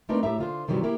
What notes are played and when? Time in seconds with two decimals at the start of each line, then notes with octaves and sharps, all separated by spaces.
0.09 A3 C4 D4 D#4 A#4 B4
0.22 A2 G4 E5 A#5
0.38 D3 F4 C5
0.67 G2 C3 D#3 E3 F#3 G3
0.83 A#3 E4 G4 A#4